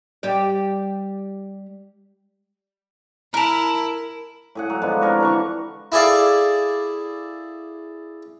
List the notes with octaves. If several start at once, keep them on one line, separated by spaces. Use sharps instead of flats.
G3 G4 D5
E4 A#4 A5 A#5 F7
A2 G#4 F#5
F#3
F3 G#3 B3 D4
C3 D4 A#4 C#5
D3 E3 C#6
E4 G#4 A4 D5 F5